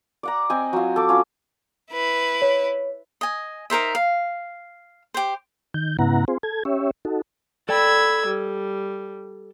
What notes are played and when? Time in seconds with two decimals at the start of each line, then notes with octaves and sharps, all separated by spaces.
0.23 D5 F#5 A#5
0.50 C4 D#5 G#5
0.73 F#3 F4
0.96 A4 D6
1.09 C#4 F4
1.91 E4 B4
2.42 C#5
3.21 D#5 G#5
3.70 D#4 A#4 C5 E5
3.95 F5
5.14 G4 C5
5.74 D#3 G6
5.99 G#2 C#3 B3 E4 F#5 A#5
6.28 C4 F4 G#4 C5
6.43 A4 G#6
6.65 C#4 G4 C#5 E5
7.05 D#4 F#4 A4
7.69 A4 D5 G5 B5 E6 G#6
8.26 G3